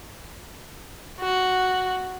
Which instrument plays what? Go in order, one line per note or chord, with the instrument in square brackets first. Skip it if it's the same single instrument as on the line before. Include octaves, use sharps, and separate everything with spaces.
[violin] F#4